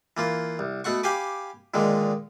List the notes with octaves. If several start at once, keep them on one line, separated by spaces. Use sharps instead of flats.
E3 A#3 F4
C2
B2 A3 F#5 C#6
G4 F5 G5 G#5 B5 D6
A#2 D3 D#3 G#3